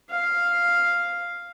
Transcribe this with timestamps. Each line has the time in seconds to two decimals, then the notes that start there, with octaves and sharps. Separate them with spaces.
0.10 F5